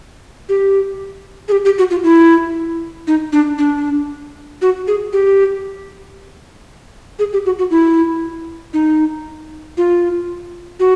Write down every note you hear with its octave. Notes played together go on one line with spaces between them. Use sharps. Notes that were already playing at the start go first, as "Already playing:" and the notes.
G4
G#4
G4
G4
F#4
F4
E4
D#4
D4
D4
F#4
G#4
G4
G#4
G4
F#4
F#4
E4
D#4
F4
F#4